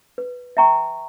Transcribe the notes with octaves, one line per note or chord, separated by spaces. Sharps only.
B4
E5 G5 A#5 C#6